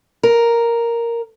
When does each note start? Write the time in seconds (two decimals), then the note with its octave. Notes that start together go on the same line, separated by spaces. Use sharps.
0.23 A#4